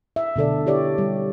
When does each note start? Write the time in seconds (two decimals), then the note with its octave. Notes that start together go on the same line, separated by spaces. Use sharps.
0.16 E5
0.36 B2 D3 A4 D5
0.66 E4 G4 C#5 D5
0.98 G3